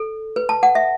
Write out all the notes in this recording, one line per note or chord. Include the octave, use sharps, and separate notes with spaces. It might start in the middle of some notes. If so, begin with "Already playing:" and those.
Already playing: A4
B4
A5
F#5
E5